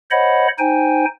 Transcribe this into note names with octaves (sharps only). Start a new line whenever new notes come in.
C5 C#5 D#5 F#5 B5
D#4 C5 G5 G#5